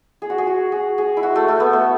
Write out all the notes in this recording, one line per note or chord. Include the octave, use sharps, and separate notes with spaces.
G#4
F#4
G#4
F#4
G#4
G#4
E4
F#4
A3
A3
B3
A3